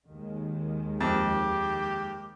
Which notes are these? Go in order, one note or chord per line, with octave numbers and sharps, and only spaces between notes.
D#2 D#3 G#3
F2 G4